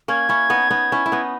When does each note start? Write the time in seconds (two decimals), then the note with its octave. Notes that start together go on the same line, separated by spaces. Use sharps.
0.08 A#3 C#4 G#6
0.29 C#4 E4
0.50 B3 D#4
0.70 B3 D#4
0.92 C#4 E4
1.06 E4
1.12 B3 D#4